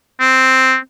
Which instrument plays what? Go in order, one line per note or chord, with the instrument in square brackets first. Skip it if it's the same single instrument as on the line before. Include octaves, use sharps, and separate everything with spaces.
[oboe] C4